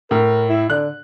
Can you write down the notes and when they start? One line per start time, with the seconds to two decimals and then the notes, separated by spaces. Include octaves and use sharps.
0.11 A2 A#4
0.49 E4
0.70 D3 F#6